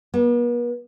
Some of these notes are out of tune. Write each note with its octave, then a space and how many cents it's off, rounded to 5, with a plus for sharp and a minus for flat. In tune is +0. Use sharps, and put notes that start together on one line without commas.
B3 -45